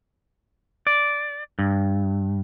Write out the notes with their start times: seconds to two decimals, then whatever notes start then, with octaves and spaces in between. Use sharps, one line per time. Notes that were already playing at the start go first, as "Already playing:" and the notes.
0.87 D5
1.59 G2